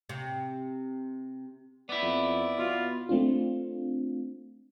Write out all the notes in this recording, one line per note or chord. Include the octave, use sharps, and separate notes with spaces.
C3
B3 E4 D5
F2
B2 F4
A3 C4 D4 F4